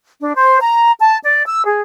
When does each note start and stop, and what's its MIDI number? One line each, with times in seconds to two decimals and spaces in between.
0.21 0.34 62
0.35 0.57 72
0.61 0.91 82
1.00 1.17 81
1.23 1.45 74
1.46 1.62 88
1.65 1.80 68